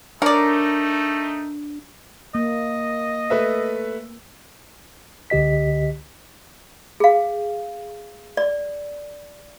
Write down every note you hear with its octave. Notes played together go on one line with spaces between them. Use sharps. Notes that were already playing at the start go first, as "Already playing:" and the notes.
A3 D4 D#4 A#4 C#5 D5
A#3 D#5
A3 B4 E5
C#2 D3 G4 D#5 B6
G#4 F5
D5